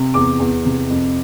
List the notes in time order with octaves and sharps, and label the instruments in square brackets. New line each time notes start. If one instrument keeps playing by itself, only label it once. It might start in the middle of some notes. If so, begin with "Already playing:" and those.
Already playing: [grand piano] C3
E2 D6
E2
C3
F2